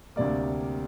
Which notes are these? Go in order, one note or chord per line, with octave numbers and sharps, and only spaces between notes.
D2 C3 G3 A#3 D5